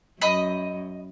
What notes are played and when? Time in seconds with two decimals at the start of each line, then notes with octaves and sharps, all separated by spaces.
0.21 F#2 D#5 B5